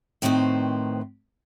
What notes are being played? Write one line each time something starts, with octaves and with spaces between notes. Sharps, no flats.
A2 D#3 C4 D#4 B4 C5